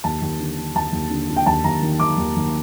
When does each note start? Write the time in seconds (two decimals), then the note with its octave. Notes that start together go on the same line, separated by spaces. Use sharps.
0.04 D#2 A5
0.22 D#2
0.40 D3
0.57 D3
0.75 D#2 A5
0.93 D#2
1.11 D3
1.29 D3
1.37 G5
1.46 D#2 A5
1.64 D#2 A#5
1.82 D#3
2.00 D#3 D6
2.17 D#2
2.36 D#2